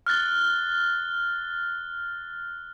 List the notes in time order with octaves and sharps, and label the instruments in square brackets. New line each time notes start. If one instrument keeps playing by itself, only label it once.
[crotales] F6 F#6 A6 G7